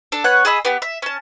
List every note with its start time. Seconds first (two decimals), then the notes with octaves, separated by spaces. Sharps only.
0.12 D4 A4
0.24 B3 C#5 F#5
0.45 G#4 D#5 B5 E6
0.65 B3 G4
0.82 E5
1.02 C#4 A5